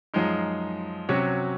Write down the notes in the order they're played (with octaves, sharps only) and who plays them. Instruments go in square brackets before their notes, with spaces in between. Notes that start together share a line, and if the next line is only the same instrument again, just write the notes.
[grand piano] F#2 F3 G#3 D#4
C3 F#3 C#4 F#4 C#5